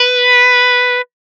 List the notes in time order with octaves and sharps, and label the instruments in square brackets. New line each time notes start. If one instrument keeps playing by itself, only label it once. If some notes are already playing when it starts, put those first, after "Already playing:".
Already playing: [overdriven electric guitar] B4